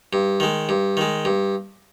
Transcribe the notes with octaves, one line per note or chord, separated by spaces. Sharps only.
G2
D#3 G#3
G2
D#3 G#3
G2